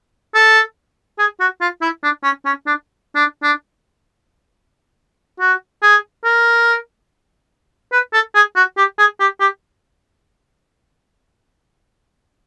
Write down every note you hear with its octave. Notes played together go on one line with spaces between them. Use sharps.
A4
G#4
F#4
F4
E4
D4
C#4
C#4
D4
D4
D4
F#4
G#4
A#4
B4
A4
G#4
F#4
G4
G#4
G4
G4